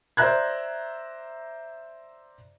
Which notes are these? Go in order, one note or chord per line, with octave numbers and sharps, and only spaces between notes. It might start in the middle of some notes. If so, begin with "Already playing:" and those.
C5 D5 E5 A#5 F#6 G#6